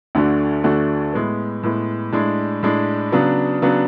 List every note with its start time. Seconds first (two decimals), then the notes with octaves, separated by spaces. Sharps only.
0.15 D2 D3 A3 D4 F#4
0.64 D2 D3 A3 D4 F#4
1.14 A2 G#3 B3
1.63 A2 G#3 B3
2.13 A2 G#3 D4
2.63 A2 G#3 D4
3.12 C#3 F#3 B3 D4
3.62 C#3 F#3 B3 D4